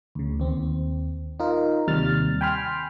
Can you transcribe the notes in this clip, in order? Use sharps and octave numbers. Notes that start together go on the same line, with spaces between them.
D2 C#3
D#2 C4
D#4 F4 A#4
D#2 C3 G3 F6 A6
G5 G#5 B5 C6 F6